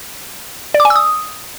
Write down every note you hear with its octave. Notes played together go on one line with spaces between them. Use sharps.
D5
D6
G#5
E6
D#6